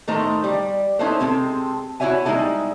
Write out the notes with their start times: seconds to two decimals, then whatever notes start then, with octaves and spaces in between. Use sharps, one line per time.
0.08 A2 D#3 A3 D#4 C5 A#5
0.44 G3
0.99 C#4 D#4 E4 A4 B4 C5
1.20 C3 G#3 C4 A4
2.00 E4 F#4 G4 C#5 E5 G#5
2.25 G3 G#3 C4 D#4 E4 A4